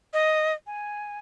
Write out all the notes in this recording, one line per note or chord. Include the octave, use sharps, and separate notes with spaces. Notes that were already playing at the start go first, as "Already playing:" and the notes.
D#5
G#5